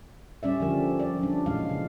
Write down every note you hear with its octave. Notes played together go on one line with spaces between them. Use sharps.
G3 C#4 D5 E5
D3 F3 A#4
D5
F#3 D4
A#2 E3 G#3 F5
C#3